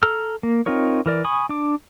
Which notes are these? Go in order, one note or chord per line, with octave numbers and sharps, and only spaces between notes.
A4 A#5 E6 F6
A#3
C4 D#4 F4 A#4 C#5
E3 A#4 D5
G#5 B5 C#6 D#6
D4 D6